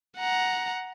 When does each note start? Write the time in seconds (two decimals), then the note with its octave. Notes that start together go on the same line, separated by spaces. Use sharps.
0.18 F#5 A#5